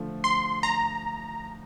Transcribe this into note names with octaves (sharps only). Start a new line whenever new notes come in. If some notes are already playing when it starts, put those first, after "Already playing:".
Already playing: D3 F3 A3
C6
A#5